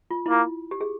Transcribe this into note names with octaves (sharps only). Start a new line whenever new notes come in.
F4
E4
A#3 F4
G4
G#4